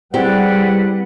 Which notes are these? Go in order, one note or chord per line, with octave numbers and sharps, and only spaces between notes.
G3 C4 E4 G4 G#4 B4 D5 F#5